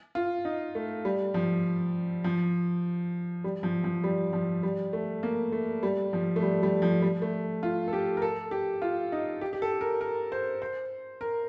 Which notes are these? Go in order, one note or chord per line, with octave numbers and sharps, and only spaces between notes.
F4
D#4
A3
G3
F3
F3
G3
F3
F3
G3
F3
G3
A3
A#3
A3
G3
F3
A3
G3
G3
F3
G3
A3
F4
A4
G4
A#4
A4
G4
F4
D#4
G4
G4
A4
A#4
A#4
C5
C5
A#4